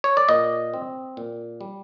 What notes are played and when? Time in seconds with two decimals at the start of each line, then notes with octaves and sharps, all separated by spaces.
0.04 C#5
0.17 D5
0.29 A#2 D#5
0.74 C4
1.17 A#2
1.61 G3